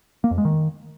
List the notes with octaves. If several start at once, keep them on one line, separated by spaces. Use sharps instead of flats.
A#3
F2
G#3
D#3